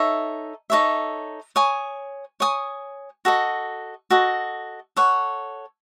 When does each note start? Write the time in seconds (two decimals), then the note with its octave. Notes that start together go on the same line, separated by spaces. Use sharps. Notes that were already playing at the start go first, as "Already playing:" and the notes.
Already playing: D#4 A4 C#5 E5
0.70 D#4 A4 C#5 E5
1.56 C#5 G#5 D#6
2.40 C#5 G#5 D#6
3.25 F#4 A4 D#5
4.10 F#4 A4 D#5
4.96 A4 C#5 F#5